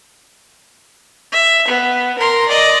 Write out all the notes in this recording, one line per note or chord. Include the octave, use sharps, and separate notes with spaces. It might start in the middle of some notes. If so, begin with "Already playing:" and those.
E5
B3
A#4 C6
D5 D#5